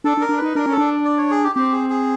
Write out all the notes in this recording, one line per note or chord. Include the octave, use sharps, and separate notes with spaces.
D4 A4
D4
A#4
D4
D#4 B4
D4 A#4
C#4
A4
D4
D5
C#5
G#4
G4
C4 G4
G#4
G#4